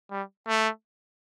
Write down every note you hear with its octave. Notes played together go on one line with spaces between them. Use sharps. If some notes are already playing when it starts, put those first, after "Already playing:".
G3
A3